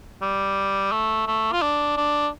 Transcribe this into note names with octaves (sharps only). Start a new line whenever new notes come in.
G3
A3
A3
F4
D4
D4